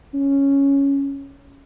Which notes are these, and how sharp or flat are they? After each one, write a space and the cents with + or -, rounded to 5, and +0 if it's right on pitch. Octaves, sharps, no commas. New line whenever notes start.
C#4 +0